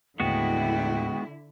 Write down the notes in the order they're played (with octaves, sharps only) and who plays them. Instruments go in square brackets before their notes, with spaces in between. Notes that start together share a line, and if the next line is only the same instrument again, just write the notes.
[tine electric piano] D#2 A2 [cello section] D3 E4 [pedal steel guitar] G#3 B3 F#4 [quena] G5